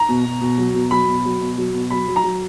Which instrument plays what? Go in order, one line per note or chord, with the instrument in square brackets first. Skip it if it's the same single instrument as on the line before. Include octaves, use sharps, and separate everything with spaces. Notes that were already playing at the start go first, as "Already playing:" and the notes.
Already playing: [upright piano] A#5
B2
B2
B2
F#3
B2
F#3 B5
B2
F#3
B2
F#3
B2
F#3 B5
F#3
A#5
F#3